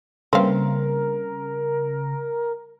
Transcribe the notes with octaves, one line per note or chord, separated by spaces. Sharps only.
C#3 G3 A#3 C4 A#4 B4 F5